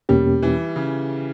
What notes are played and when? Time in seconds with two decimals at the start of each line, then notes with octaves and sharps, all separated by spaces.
0.09 E2 B2 G3 A#3 C#4 G4
0.42 E3
0.76 C#3